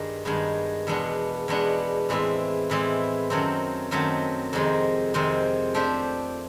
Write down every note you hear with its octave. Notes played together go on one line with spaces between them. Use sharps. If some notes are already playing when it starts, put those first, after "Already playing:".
Already playing: G2 D#3 G#3
G2 D#3 G#3 B3
E2 B2 G#3 B3 D4
E2 B2 G#3 B3 D4
A2 E3 G#3 C4 E4
A2 E3 G#3 C4 E4
F#2 D#3 F#3 A3 C4
F#2 D#3 F#3 A3 C4
F2 C3 D#3 G#3 C4
F2 C3 D#3 G#3 C4
F3 A3 D4 G4 C5